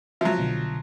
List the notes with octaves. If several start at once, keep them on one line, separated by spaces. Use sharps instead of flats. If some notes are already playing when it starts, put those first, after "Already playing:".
F3 F#3 E5
C2 B2 D3